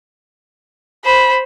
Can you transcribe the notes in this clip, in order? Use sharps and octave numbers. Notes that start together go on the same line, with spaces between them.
C5 B5